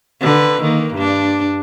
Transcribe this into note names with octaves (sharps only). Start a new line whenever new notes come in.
D3 B4
D#3 A#3
G2 D4